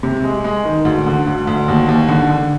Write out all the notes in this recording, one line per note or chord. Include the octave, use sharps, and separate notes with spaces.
C3
G#3
G#3
D#3
D2
D3
D2
D2
D#2
D#2
D3
D3